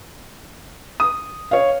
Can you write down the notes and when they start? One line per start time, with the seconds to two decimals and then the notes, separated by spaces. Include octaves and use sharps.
1.00 D#6
1.51 C#5 F5